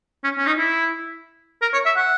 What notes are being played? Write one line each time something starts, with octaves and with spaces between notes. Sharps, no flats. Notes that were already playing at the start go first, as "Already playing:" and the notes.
C#4
C#4
D#4
E4
A#4
C#5
E5
F#5